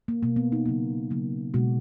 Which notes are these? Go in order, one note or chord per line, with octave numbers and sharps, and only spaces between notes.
A#3
B2 A#3
B3
D#4
C#3 F#3 A#3
C#3 F#3 A#3
B2 G#3 F#4